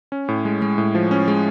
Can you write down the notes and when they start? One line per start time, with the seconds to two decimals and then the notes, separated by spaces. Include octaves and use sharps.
0.12 C#4
0.28 A2
0.45 G#3
0.62 G#3
0.78 A2
0.95 F3
1.11 C#4
1.28 G#3